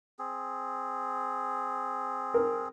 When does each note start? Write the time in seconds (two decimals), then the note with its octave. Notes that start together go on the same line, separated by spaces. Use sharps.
0.19 C4 G#4
2.34 A#4